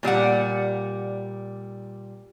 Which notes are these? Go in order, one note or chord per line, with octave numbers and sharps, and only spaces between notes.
A#2 G3 D5 F#5